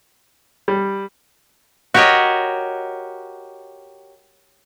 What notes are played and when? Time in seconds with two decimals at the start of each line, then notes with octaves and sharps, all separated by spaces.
0.68 G3
1.94 F#4 G4 A#4 C#5 D#5